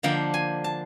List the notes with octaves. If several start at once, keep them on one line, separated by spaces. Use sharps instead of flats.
D3 F3 A#3 D4 G5
G#5
A5